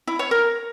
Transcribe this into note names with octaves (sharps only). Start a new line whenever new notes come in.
E4
C#5
A#4